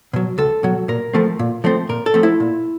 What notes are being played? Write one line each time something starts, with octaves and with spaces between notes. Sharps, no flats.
B2 F#3
C#2 A4
B2 F#3
A#2 A#4
F3 A3 C4
A#2
F3 A3 C4
A#2 A#4
A4
F3 A3 C4
E4
A#2